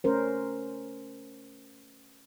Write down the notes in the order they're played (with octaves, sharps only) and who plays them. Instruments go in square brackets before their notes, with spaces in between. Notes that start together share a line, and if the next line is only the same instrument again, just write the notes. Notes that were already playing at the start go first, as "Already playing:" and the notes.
[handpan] A3 C#4 A#4 C5